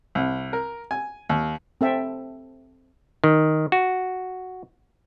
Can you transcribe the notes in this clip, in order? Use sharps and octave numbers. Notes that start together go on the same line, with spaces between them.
C2
A#4
G#5
D#2
C4 A4 E5 G5
D#3
F#4